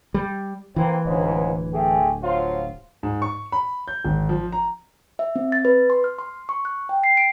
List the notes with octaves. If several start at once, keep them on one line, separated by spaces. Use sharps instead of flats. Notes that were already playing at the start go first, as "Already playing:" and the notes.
G3
E3 A#3 C4
D1 C#2 G#2
A3 G4 G#4
F3 F#3 F4
G#2
C#6
B5
G6
G#1
F3
A#5
E5
C4
A6
B4
C6
F6
C6
C#6
F#6
G5
C7
D7